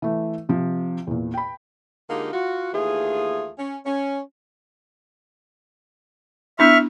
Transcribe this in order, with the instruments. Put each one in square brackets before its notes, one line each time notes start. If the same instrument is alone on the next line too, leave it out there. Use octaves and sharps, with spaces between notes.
[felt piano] E3 A3
C3 F3
E2 A#2
G5 B5
[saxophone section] D3 G#3 A#3 D#4 F4 G4
F4 F#4
D#2 E3 A3 F4 G#4
C#4
C#4
[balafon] B3 D4 E4 [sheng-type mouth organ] E5 C#6 F6